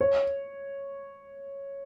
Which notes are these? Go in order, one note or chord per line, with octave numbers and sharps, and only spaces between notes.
C#5